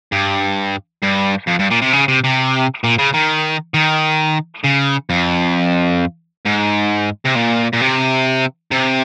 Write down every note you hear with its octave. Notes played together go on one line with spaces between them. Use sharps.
G2
G2
F2
G2
A#2
C3
C#3
C3
C3
A#2
C#3
D#3
D#3
C#3
F2
G#2
C3
A#2
A#2
C3
C3